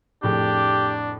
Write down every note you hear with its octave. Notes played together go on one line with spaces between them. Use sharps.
F1 A2 D4 G4 G#4